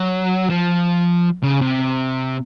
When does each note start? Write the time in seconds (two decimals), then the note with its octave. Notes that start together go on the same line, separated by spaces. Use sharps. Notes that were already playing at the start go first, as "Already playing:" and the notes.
Already playing: F#3
0.49 F3
1.43 C#3
1.61 C3